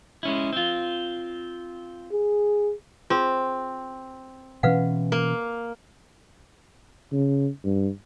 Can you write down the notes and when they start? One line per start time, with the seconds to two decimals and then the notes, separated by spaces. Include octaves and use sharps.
0.23 G#3 C#4 E4
0.53 C4 F4
2.12 G#4
3.10 C4 F4 G#4 C5
4.63 B2 E3 C#4 B4 F5 F#5
5.12 A#3
7.12 C#3
7.65 G2